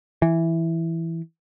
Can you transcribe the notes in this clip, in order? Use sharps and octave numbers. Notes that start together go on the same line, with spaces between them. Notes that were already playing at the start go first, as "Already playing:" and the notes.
E3